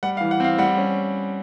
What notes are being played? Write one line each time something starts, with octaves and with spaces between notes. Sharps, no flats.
G3 F#5
F5
E3
F#5
C4 F5
G3 F#5
C#4